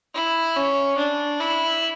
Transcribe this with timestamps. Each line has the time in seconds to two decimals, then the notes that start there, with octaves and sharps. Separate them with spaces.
0.15 E4
0.56 C#4
0.98 D4
1.40 E4